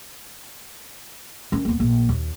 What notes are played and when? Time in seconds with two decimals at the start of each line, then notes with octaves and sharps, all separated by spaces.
1.52 D#3 C#4
1.65 D#2 B3
1.80 A#1
2.09 D#2